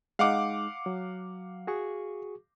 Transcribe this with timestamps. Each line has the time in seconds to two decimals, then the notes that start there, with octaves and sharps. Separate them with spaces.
0.19 G#3 D#4 F5 F#5 D6
0.86 F#3
1.67 F#4 G#4 C#6